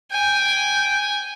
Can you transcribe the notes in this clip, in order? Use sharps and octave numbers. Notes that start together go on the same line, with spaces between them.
G5 G#5